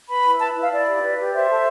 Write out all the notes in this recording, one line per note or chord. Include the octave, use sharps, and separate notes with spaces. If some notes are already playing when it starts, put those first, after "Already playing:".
B4 B5
E4
B4 A5
E4
F5
E4 D5
G4
B4
G4
C5 E5
A4